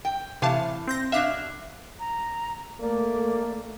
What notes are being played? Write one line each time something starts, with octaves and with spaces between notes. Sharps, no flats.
G5
A2 C3 E3 F5 A5
C4 G6 A#6
B2 D4 E5 F5 F#6
A#5
A3 A#3 D5